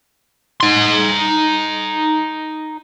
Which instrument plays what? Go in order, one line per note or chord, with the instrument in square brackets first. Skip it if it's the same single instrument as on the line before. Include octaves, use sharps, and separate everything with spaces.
[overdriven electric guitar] D#4 C6